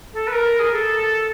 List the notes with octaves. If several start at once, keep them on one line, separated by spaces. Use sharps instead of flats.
A4
B4
A#4
G#4
A4